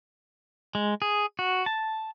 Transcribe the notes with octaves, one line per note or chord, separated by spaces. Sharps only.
G#3
G#4
F#4
A5